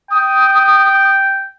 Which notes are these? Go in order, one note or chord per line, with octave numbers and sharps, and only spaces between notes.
G5 D#6